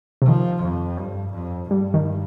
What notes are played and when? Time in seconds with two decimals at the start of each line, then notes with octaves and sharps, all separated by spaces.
0.22 C3
0.27 D#3 F3
0.64 F2
0.99 G2
1.34 F2
1.71 G2 G3
1.94 D#3